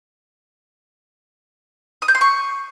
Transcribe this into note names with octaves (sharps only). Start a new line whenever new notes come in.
D#6
G6
C6
C#6